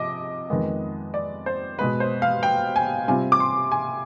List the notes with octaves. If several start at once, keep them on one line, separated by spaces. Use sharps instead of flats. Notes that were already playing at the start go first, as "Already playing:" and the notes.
Already playing: C3 F3 D#5 D6
F2 D#3 G#3 B3
D5
C5
B2 G#3 B3 B4
C5
F5
G5
G#5
C3 G3 C4 F4 G#5
D6
C6
G#5